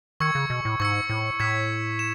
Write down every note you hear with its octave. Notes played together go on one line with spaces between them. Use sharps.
D#3 C#6 E6 G#6 C#7
C#3
B2
A2
G#2 C#6 E6 G#6 C#7
A2
A2 G#6 B6 E7
E7